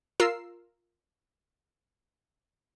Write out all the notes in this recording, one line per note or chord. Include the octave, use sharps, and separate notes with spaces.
F4 A#4 E6 C7